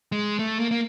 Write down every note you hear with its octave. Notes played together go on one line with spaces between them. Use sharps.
G#3
A3
A#3
A#3